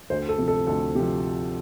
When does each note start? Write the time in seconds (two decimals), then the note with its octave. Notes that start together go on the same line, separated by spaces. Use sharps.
0.10 D2 C5
0.29 A4
0.38 C3 F3
0.48 A4
0.67 D2 A4
0.95 C3 G4
1.00 F3